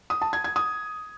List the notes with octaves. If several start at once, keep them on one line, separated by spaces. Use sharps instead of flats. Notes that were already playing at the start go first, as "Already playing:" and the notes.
D#6
A5
G#6
G#6
D#6